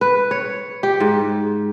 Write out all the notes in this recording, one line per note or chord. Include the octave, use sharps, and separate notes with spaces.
B4
C#5
G4
G#2